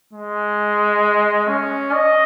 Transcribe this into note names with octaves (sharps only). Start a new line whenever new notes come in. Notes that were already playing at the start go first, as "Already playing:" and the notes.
G#3
C#4
D#5